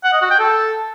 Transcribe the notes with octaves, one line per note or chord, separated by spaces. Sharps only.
F#5
D#5
F#4
G5
A4